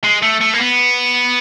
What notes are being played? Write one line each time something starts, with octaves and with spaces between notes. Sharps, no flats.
G#3
A3
A3
A#3
B3